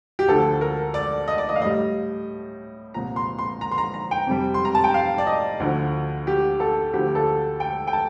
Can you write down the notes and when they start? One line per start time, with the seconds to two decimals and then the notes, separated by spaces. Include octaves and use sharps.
0.19 G4
0.28 D2 D3 F3 A4
0.61 A#4
0.94 D5
1.28 D#5
1.38 D5
1.49 D#5
1.56 F5
1.61 A2 G3 D#5
2.94 C2 A#2 F3 A#5
3.16 C6
3.38 C6
3.61 A#5
3.71 C6
3.78 A#5
3.94 A#5
4.11 G5
4.27 F2 C3 G3
4.54 C6
4.65 A#5
4.75 A5
4.84 G5
4.94 F5
5.18 D5
5.27 D#5
5.60 D2 D3 F3
6.27 G4
6.60 A4
6.93 D2 D3 F3 G4
7.15 A4
7.60 G5
7.87 G5
7.93 A5